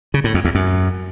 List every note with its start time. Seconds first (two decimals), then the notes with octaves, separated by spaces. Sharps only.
0.14 C#3
0.24 A2
0.34 F2
0.45 E2
0.55 F#2